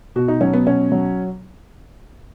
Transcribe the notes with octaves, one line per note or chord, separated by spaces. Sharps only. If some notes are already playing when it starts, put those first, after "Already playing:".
B2 F#4
D#4
F#3 C#4
B3
B2 C#4
F#3